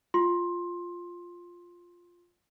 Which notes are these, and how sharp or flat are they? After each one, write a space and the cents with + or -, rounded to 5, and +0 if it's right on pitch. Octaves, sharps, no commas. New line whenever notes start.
F4 +0 C6 +15